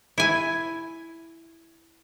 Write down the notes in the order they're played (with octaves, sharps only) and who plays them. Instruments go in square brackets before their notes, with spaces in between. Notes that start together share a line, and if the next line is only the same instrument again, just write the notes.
[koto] E4 G#5